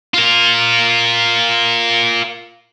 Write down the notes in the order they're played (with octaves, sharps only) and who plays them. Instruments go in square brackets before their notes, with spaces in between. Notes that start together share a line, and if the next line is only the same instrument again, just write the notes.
[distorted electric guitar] F4 A#4